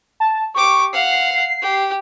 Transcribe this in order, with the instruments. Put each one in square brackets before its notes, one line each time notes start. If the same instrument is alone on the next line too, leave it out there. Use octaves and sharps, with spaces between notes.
[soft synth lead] A5
[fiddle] G4 D6 [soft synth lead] C#6
[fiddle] F5 F#5 [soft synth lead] C7
[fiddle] G4